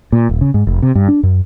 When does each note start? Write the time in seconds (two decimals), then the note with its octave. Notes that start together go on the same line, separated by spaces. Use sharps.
0.12 A#2
0.29 D#1
0.41 C#3
0.54 G#2
0.67 F1
0.82 C3
0.95 G2
1.08 D4
1.23 F#2